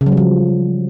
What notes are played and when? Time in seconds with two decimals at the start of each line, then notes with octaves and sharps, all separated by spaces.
0.01 C#3
0.06 F#3
0.12 G3
0.17 F3